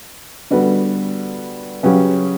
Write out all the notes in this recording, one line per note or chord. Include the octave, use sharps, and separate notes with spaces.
D3 G3 B3 F#4 B4
C#3 F#3 C#4 G4 B4